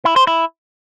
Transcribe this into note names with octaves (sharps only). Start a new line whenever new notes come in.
E4
C5
E4